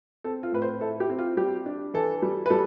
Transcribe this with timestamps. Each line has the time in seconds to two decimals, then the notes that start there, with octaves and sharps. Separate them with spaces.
0.24 C4 A4
0.43 F4
0.52 A2 B4
0.62 C5
0.81 E4 A4
1.00 G4
1.10 C4
1.19 F4
1.37 G3 G4
1.66 D4
1.94 E3 A4
2.22 G3
2.46 B4
2.50 G3 A4